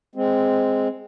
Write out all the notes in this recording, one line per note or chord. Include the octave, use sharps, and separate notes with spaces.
G#3 C4